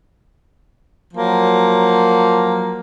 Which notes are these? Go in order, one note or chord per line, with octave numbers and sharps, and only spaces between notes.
F3 F#3 A#3